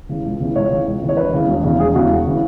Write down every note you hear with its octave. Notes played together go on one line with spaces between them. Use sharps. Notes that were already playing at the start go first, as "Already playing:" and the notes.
C#3 E3
C#2
C#3 E3
C#2 C#5
C#3 E3
C#2
C#3 E3
C#5
E1 B4
E2 C#3 E3
E1
E2 C#3 E3
E1 G#4
E2 C#3 E3 F#4
E1
C#3 E3